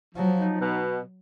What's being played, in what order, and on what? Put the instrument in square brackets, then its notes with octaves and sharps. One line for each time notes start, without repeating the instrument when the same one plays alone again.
[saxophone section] F3 [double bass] F#3
[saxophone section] D#4
B2